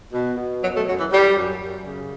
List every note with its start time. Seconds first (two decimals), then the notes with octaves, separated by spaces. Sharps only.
0.12 B2
0.37 B2
0.61 F#2 F#3
0.74 A3
0.86 F#2 F#3
0.99 E3
1.11 F#2 G3
1.36 F#2
1.60 F#2
1.86 C#3